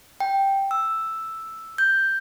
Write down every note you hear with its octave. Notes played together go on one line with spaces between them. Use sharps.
G5
E6
G6